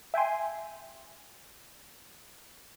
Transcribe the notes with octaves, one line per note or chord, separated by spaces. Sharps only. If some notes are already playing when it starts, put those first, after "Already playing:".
E5 G5 G#5 C6